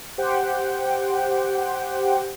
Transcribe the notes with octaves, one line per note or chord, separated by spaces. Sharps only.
G4 C5 F#5 G5